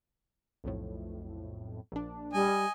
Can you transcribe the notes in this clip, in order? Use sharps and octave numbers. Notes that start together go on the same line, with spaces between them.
B1 F2 A2
A#1 D4
G3 D#5 G#5